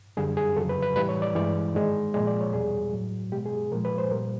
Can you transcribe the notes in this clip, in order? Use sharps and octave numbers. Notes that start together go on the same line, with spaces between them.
F#2 D3 G3 G#4
G#4
F2 C#3 F#3 A4
B4
B4
A2 E3 G3 B4
C#5
D5
G2 E3 G#3 D5
G#2 D#3 G#3
A#2 F3 G#3 D5
D5
C#5
E2 B2 G3 G#4
A2 F#3
B2 G#3 G4
G#4
A#2 F3 G#3 A#4
B4
C5
A#2 G3 A#4